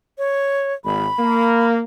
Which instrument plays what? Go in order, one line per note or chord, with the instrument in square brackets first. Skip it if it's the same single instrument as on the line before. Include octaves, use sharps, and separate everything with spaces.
[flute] C#5
[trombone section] G#1 [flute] B5
[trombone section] A#3